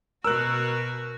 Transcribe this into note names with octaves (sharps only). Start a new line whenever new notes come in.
B2 F#4 A#4 E6 F#6